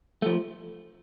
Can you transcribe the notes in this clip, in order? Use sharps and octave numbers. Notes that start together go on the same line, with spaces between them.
F3 A3